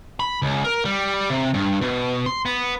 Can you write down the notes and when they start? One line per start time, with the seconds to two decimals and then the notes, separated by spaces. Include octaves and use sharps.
0.20 B5
0.42 C#2
0.64 A#4
0.85 G3
1.30 C3
1.54 G2
1.81 B2
2.26 C6
2.46 B3